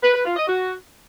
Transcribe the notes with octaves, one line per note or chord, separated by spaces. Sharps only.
B4
B4
F4
D#5
F#4